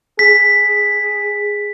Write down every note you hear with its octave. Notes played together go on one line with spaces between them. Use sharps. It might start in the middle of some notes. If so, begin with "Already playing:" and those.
G#4 B6